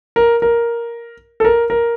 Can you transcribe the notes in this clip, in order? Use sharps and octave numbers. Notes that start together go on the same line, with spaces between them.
A#4
A#4
A4
A#4
A#4